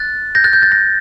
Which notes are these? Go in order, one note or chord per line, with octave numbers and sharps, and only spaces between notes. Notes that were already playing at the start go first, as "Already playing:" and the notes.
Already playing: F#6 A6
G6 A#6
F#6 A6
G6
F#6 A6
G6 A#6